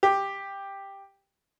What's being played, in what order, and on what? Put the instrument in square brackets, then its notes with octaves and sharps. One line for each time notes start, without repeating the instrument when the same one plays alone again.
[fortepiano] G4